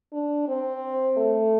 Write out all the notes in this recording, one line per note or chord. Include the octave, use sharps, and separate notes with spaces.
D4
C4
A3